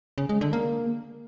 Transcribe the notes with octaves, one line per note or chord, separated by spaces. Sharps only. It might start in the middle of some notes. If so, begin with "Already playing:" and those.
C#3
G#3
D3
A#3